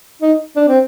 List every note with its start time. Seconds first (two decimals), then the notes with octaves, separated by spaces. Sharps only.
0.22 D#4
0.56 D4
0.68 C4